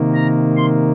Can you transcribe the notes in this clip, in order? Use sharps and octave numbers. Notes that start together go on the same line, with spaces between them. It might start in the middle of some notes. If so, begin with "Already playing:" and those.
Already playing: C3 D#3 A#3
A#5
C6